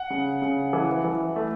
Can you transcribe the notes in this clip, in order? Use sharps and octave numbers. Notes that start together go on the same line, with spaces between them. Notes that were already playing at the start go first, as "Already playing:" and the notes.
Already playing: F#5
C#3
C#3
E3
E3
A3